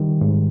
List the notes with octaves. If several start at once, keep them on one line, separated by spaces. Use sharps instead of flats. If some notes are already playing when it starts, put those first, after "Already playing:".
Already playing: D#3 G3
G#2